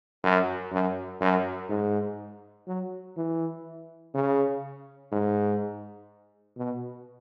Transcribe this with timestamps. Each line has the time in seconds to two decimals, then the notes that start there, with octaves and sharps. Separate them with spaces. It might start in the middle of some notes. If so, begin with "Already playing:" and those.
0.24 F#2
0.72 F#2
1.21 F#2
1.70 G#2
2.67 F#3
3.17 E3
4.14 C#3
5.12 G#2
6.57 B2